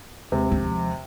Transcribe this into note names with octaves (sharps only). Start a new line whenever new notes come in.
D#2 C3 G#3
F3